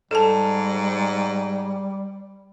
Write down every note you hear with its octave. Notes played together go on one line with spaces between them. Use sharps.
G#2 G3 A4 A5